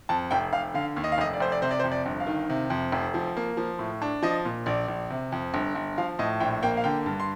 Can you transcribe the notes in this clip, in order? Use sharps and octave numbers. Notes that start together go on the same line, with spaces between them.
F2 A5
F1 G5
F1 F5
D3 F5
D#2
D#5
F5
F1 D#5
D5
F1 C5
D5
C3 C5
D5
C5
F2
D5
G1
F5
D#3
C3
F2
F1
F3
A#3
F3
A2
D4
F3 D#5
A#2
A#1 D5
A#1
C3
F2
G1
G1
F3 F5
A2 D#5
A#1 G5
A#3 G5
F5
D3 G5
G2
C6